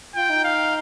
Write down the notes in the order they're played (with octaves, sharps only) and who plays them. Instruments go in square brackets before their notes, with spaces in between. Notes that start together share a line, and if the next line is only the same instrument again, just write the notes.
[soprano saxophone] F4 [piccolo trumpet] G5
[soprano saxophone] D#4
[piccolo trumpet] F5